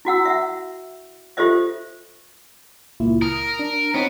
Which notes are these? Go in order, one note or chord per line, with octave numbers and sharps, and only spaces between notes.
E4 F#4 F#5 E6
E5 F#5
F4 G4 A4 C5 D#5 E5
C#2 A#2 E4
A#4 D#6 F6
D4
B3 C4 D#4 C#5